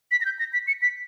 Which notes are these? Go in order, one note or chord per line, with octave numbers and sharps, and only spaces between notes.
B6
A#6
G6
A#6
B6
C#7
B6